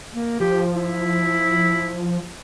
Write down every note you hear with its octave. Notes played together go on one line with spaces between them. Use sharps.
A#3
F3 G4
E4